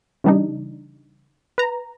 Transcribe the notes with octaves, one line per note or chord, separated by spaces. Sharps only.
C#3 E3 G3 D4 D#4
B4 A#5